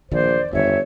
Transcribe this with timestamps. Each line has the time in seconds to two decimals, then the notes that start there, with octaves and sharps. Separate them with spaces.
0.12 A#1 E2 D#3 C5 D5
0.53 G1 F2 D#3 C#5 E5